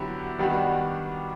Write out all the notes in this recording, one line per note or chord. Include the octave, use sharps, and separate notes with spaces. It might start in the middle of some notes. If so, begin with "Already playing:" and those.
Already playing: D3 F#3 B3 E4 G4
D#3 G3 B3 D4 F#4